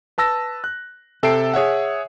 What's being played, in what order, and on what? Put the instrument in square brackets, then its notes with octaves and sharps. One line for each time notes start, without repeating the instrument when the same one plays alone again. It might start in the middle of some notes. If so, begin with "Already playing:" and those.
[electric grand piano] B4 A5 E6 A#6
F#6
C3 A4 E5 G5 C7 D7
G#4 C#5 E5 F#5